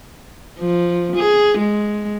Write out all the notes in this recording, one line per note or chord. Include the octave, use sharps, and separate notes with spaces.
F3
G#4
G#3